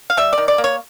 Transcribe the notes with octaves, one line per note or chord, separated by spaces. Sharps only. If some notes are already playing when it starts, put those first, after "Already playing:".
F5
G3 E5
D5
D#3
D5
A#3
C#5